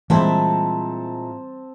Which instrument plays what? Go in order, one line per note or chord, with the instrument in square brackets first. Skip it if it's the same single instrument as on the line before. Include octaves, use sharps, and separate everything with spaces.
[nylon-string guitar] A#2 G#3 E4 [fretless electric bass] E3 G3 [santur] C4 A5